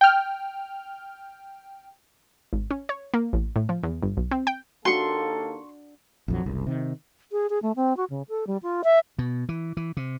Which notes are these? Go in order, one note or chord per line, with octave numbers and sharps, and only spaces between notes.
G5 F6
G#1
C#4
C#5
A#3
A1
A2
F3
E2
G1
B1
C4
G5
D#2 A#3 D4 F#4 A4 C6 C#6
A#1 F2 F#3
F#1 C2
C3 D#3
G#4
G#4
A3
C4
F#4
C#3
A4
G3
F4
E5
B2
E3
E3
C3